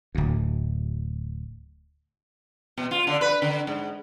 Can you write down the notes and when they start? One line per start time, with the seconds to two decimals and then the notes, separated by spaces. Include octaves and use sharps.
0.15 D1 D2
2.78 B2
2.91 F4
3.07 D3
3.21 B4
3.42 D3
3.67 G#2